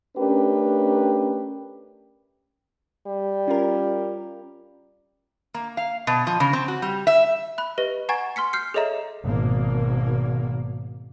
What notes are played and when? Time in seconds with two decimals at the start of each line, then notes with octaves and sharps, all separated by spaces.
0.17 A3 C#4 D4 G4 A#4 B4
3.07 G3
3.48 C#4 F4 A#4
5.54 A#3
5.77 F5
6.07 B2
6.27 F3
6.40 C#3
6.53 C4
6.68 F#4
6.82 G3
7.07 E5
7.58 B5 F#6
7.78 G4 B4 D#5 A#6
8.09 F#5 G#5 A#5 C#6 G#6 A6
8.36 C6 F6 B6 C#7
8.53 F6 G6 C7 C#7
8.74 G#4 A4 C#5 D#5 E5 A#5
9.23 G#1 G#2 B2 A#3